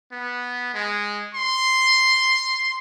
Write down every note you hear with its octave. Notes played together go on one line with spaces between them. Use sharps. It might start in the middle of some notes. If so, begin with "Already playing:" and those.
B3
G#3
C6